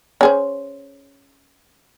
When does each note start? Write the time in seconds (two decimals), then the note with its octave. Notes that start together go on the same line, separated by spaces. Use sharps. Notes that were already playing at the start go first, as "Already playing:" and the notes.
0.21 C#4 G#4 C5